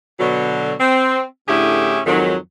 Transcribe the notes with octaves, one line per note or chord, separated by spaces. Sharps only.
B2 D3 F#3
C4
A2 D3 C#4 E4 G4 G#4
F2 G#2 D#3 F#3